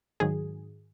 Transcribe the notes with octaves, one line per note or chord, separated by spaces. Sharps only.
G#2 D#3 F#3 G#4